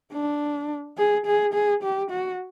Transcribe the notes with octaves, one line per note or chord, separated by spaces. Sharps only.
D4
G#4
G#4
G#4
G4
F#4